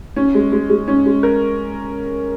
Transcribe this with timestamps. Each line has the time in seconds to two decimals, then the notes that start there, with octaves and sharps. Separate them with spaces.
0.16 C#4
0.34 G#3
0.52 G#3
0.70 G#3
0.88 C#4
1.06 G#3
1.23 A#4